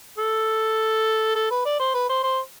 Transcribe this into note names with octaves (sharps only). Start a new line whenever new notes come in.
A4
A4
B4
D5
C5
B4
C5
C5